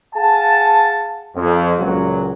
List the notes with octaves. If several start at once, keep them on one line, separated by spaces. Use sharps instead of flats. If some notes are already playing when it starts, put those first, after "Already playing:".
G#4 F5 F#5 G#5 A5
F2
C#2 A#2 F#3